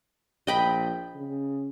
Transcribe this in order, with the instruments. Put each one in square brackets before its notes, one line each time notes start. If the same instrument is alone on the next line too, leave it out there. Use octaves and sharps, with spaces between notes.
[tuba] A#1 [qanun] D#5 G5 B5
[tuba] C#3